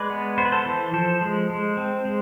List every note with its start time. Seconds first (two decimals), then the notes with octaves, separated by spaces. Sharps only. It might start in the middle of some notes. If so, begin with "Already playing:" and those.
Already playing: G#3 B4 D5
0.10 B3
0.38 B3 C5
0.45 B4
0.52 A4 C5
0.66 E3
0.93 F3 A4 C5
1.21 G#3
1.50 G#3
1.77 C4
2.05 G#3